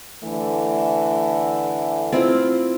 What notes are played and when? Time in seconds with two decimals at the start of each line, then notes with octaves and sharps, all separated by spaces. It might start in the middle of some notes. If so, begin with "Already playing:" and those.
0.23 D3 E3 A3
2.12 C4 E4 F4